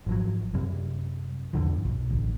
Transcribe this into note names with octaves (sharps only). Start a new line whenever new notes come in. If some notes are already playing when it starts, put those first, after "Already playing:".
G#1 F3 F#3
F#2 C3 G3
E2 G2 D3 F3
B1
A1 D2